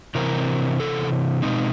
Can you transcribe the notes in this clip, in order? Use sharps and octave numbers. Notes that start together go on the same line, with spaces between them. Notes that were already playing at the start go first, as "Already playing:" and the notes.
C3 E3 C4 A#4
A4
B2 G#3 C4 D#4